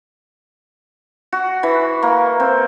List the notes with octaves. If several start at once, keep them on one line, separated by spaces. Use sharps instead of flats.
F#4
E3
A#3
C4